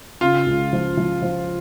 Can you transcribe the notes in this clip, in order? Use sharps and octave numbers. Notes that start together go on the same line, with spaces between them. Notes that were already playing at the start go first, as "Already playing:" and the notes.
C#3 F4
C#2
F3
F3
F3